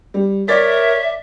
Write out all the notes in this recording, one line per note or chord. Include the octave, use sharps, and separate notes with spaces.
G3
A#4 C#5 D5 E5 A6 B6